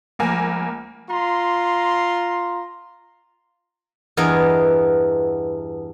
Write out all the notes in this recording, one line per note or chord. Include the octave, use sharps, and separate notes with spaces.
C#2 F3 A3 A#3 G#5
F4 A#5 C6
E2 G2 B3 A#4 D#5 G#5